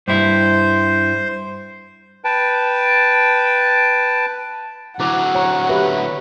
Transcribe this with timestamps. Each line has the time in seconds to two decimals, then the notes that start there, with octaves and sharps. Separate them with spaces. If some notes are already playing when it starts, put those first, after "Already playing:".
0.08 G2 E4 C5
2.25 B4 G5 A5
5.00 D2 F#3 E4 C5 F#5 D6
5.35 C#5 G#5 A#5 C#6
5.69 G4 B4 E5